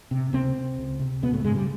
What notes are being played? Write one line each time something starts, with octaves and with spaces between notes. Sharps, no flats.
C3
C#2 C3 C4
C3
C#2
C3
C#2 B2 B3
A2 A3
G#2 C#3 G#3
G3